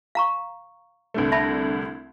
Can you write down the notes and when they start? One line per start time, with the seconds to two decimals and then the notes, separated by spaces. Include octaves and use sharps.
0.15 F5 A#5 C#6
1.14 C2 D3 A3
1.32 E5 A5 B5